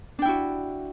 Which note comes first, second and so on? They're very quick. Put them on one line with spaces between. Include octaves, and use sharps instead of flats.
D4 G5 E4 F#4